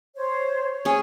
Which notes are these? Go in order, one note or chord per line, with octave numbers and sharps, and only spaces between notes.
C5 C#5
C#5
C#4 G#4